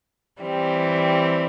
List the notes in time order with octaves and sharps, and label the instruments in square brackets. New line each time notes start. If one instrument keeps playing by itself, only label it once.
[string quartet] E3 G3 C4